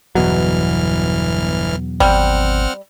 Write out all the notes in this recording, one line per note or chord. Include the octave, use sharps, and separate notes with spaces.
G1 E2 B2 E3 F#3 F6
G#1 G3 C4 F#5 F6